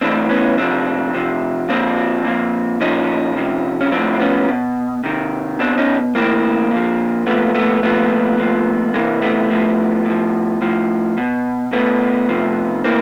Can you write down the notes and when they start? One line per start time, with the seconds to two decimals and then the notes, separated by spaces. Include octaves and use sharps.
0.01 A2 E3 C4 D4
0.29 B3 C#4
0.58 C3 F3 C4 D4
1.14 C3 F3
1.69 A#2 F3 C4 D4
2.25 A#2 F3
2.81 A#2 F3 C#4 D#4
3.37 C3 F3
3.81 C#4
3.92 A2 F3 C4 D4
4.20 B3 C#4
4.48 B2
5.04 C3 D#3
5.59 B2 C4 D4
5.78 C#4 D#4
6.15 A2 E3 A#3 C4
6.71 A#2 F3
7.26 A#2 F3 A3 B3
7.55 A3 B3
7.83 A#2 F3 A3 B3
8.38 A#2 F3
8.94 C3 G#3 A#3
8.98 E3
9.22 A3 B3
9.51 A2 F3
10.06 A2 F3
10.62 A2 F3
11.18 B2
11.73 B2 A3 B3
12.29 C3 F3
12.84 A2 E3 A#3 C4